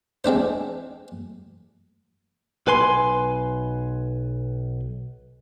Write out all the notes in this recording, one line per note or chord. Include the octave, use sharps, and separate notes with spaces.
G#3 C4 D4 C5
B1 B4 G#5 C6